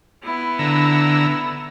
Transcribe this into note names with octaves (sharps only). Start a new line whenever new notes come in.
B3 E4
D3 A#5 E6